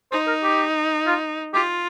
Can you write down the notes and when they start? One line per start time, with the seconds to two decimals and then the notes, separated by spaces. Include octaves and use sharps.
0.12 D#4 C5
0.27 A#4
0.44 G4
1.07 F4
1.54 F4 G4